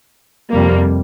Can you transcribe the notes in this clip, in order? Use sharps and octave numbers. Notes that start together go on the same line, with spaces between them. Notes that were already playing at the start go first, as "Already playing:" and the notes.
F2 C3 G3 A#3